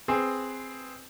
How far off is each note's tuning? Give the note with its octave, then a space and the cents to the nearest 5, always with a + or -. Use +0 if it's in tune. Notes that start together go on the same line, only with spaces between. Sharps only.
C4 +0 G#4 +0 B4 +10